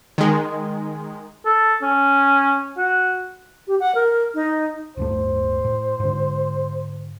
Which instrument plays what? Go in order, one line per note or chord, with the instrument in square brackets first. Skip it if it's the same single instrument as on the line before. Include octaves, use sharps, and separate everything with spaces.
[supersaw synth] D#3 G#3
[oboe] A4
C#4
F#4
[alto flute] G4
F#5
A#4
D#4
[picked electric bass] D1 G2 A3 [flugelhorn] C5
[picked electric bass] A2
G#2 D3